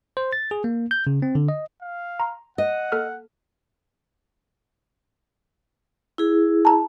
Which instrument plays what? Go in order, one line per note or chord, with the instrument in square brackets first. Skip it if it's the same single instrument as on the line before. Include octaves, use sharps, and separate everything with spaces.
[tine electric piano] C5
A6
G#4
A#3
G6
C#3
C4
D3
D#5
[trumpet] F5
[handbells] A#5 C6
[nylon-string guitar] D#5 [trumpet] F#5
[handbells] A#3 A4 F6
[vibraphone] E4 G#4
[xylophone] A5 A#5